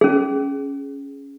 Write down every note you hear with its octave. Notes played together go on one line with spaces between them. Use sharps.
C#4 G#4